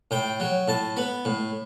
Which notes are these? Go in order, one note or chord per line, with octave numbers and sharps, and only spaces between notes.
A2 G5
F#3
A2 A5
B3 B5
A2